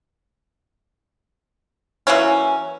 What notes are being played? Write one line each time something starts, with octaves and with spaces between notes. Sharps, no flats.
E3 F#3 A#3 C#4